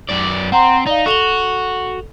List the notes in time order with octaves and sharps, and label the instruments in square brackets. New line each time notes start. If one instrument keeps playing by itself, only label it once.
[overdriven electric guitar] F#2 D5
[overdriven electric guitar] C4 [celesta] F#5 A#5 C6
[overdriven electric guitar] D#4 [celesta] D5 F5
[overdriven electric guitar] F#4 [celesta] A4 F7 G7